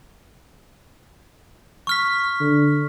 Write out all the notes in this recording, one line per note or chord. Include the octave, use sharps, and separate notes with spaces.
C#6 F6 B6
D3